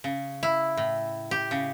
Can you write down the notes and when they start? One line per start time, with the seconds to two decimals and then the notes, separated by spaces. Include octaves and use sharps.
0.04 C#3
0.43 E4
0.77 A2
1.31 G4
1.51 C#3